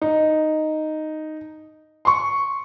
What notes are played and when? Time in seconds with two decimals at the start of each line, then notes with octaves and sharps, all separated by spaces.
0.01 D#4
2.05 C6 C#6